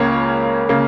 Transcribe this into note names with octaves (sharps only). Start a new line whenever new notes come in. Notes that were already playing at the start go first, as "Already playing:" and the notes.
Already playing: C#2 C#3 A#3 C#5
C#3 A#3